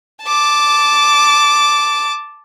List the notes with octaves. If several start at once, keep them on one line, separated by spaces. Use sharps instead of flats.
A5 D6